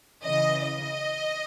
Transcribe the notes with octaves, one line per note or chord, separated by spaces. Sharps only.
C#3 E3 D#5
D#5